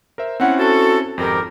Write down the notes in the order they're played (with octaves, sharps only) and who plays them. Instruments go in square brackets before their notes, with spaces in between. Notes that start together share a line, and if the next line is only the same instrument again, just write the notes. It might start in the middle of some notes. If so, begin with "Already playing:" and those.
[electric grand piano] A#4 C5 E5
[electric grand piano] C4 C#4 E4 [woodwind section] F#5
[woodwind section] F#4 A4
[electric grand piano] G#1 F2 [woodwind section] G4 A#4